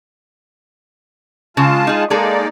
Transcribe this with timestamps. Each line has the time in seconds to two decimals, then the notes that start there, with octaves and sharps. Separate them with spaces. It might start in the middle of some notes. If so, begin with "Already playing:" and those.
1.57 C#3 G#3 F4 A5
1.87 D#4 G#4
2.10 G#3 A#3 D#4 G#4 A4 D5